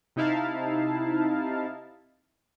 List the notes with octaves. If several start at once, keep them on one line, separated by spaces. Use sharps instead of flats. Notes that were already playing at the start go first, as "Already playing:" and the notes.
C3 D#4 E4 F5 A5